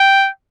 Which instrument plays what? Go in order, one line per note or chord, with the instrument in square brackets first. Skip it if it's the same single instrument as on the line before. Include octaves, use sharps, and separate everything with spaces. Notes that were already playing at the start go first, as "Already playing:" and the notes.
Already playing: [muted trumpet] G5